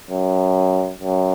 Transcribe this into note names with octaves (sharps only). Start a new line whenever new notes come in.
F#2
F#2